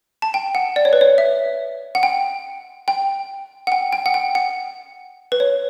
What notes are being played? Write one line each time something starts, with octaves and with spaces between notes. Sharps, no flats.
A5
G5
F#5
D5
C#5
B4
C#5
E5
F#5
G5
G5
F#5
G5
G5
F#5
G5
F#5
B4
C#5